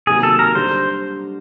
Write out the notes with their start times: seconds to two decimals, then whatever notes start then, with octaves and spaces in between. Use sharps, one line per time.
0.07 C3 D#3 F#3 A#3 G#4
0.23 A4
0.39 A#4
0.55 D3 G3 C5